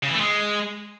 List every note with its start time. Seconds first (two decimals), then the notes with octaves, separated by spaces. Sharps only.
0.03 C#3
0.09 E3
0.15 A3
0.21 G#3